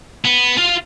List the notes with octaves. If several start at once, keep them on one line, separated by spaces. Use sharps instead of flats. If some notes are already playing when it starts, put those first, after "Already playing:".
B3
F4 F5